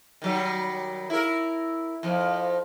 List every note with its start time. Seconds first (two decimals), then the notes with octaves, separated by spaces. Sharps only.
0.22 D#3 F#3 G3
1.10 E4 A#4
2.03 F2 F3